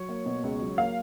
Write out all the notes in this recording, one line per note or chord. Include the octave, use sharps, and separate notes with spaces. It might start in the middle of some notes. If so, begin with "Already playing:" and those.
Already playing: F#3 C#5
A#3
B2
C#2
F#3
A#3 F5